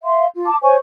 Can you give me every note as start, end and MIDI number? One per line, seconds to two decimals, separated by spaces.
0.03 0.26 76
0.03 0.26 77
0.03 0.26 84
0.35 0.46 65
0.46 0.56 81
0.46 0.56 86
0.63 0.76 72
0.63 0.76 73
0.63 0.76 80
0.63 0.76 85